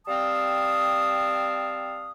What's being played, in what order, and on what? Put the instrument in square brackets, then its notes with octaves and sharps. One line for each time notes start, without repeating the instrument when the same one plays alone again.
[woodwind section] G3 C4 F5 A5 D#6